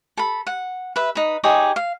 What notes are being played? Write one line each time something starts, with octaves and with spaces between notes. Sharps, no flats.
A4 B5
F#5
B4 E5
D#4 B4
D#4 G4 G#4 C#5
F5